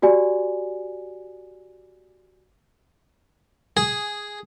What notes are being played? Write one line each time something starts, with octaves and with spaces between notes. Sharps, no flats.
F#4 G4 D5 G#5
G#4